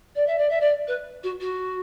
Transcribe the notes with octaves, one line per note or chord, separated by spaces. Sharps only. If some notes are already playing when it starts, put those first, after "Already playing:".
D5
E5
D5
E5
D5
B4
F#4
F#4